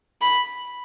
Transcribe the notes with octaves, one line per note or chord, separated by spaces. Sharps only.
B5